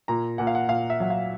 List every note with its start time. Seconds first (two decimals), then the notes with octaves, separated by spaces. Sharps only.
0.08 A#2 A#5
0.38 A#2 F#5
0.47 F5
0.55 F#5
0.69 A#2 F5
0.90 E5
1.00 F#3 F#5
1.10 F5